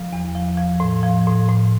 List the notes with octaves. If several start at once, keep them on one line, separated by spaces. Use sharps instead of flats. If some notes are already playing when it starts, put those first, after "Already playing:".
Already playing: F3
E2
F3
F3
A2
F3
A2
A2